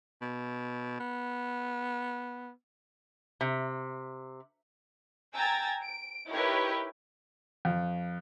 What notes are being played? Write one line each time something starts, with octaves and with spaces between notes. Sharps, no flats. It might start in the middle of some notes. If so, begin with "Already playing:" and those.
B2
B3
C3
G5 G#5 A#5 E6 G#6 A6
D7
D#4 E4 G4 A#4 B4 C#5
F2